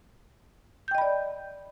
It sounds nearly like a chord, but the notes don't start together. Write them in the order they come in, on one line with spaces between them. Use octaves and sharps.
G6 G5 D#5 B5 D5